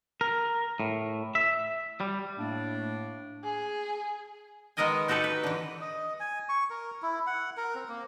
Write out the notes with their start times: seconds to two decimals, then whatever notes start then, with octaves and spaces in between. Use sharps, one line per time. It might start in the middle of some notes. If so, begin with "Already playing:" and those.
0.21 A#4
0.80 A2
1.35 E5
2.00 G3
2.38 A2 A3 A#3 D4
3.44 G#4
4.77 D#3 G#3 B3 A#4 D#5 G#5
5.08 D#4 F#4 G4 A4 B4
5.24 B4
5.44 D3 E3
5.81 D#5
6.20 G#5
6.49 C#6
6.70 A#4
7.02 E4
7.27 F#5
7.57 A#4
7.75 C4
7.89 A#3